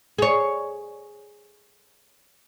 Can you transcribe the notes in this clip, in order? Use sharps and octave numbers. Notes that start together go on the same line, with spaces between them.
G#4 C#5